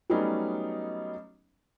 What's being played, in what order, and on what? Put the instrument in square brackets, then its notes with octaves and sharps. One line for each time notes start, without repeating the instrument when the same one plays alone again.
[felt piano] F#3 G3 A3 B3 C#4 D#4